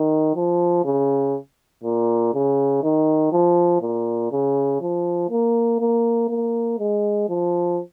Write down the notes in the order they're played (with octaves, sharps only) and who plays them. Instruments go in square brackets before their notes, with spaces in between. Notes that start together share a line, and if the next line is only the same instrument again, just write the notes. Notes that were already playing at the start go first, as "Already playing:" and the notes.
Already playing: [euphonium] D#3
F3
C#3
A#2
C#3
D#3
F3
A#2
C#3
F3
A#3
A#3
A#3
G#3
F3